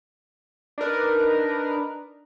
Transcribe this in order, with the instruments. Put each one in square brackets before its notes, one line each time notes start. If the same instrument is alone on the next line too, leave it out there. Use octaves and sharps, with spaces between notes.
[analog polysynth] D4 D#4 A#4 B4